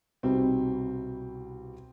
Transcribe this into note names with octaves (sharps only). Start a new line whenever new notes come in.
C2 B2 G3 B3 C4 D#4